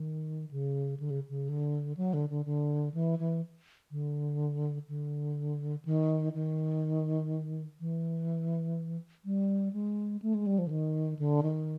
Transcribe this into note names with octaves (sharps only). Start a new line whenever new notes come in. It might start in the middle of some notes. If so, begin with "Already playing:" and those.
Already playing: D#3
C#3
D3
C#3
C#3
D3
F#3
D3
D3
D3
E3
E3
D3
D3
D#3
D#3
E3
G3
G#3
A3
G#3
G3
F3
D3
D#3
D3
D#3